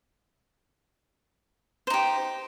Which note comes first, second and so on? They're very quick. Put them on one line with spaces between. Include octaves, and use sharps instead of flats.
C5 D#4 G4